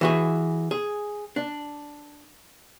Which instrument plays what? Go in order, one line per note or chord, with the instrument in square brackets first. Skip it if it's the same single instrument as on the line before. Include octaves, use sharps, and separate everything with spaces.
[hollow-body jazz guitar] E3 F#4 G#4
G#4
D4